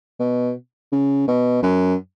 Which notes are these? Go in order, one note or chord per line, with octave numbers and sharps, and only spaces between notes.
B2
C#3
B2
F#2